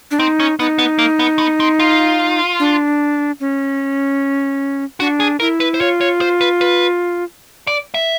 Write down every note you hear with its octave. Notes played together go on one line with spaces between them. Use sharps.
D4
C4 D#4
C#4
B3 D#4
B3
A#3
B3
B3
C4
F4
D4
C#4
D4 F#4
G#4
E4 A#4
B4
C5
F4 C#5
C#5
C5
B4
B4
D5
E5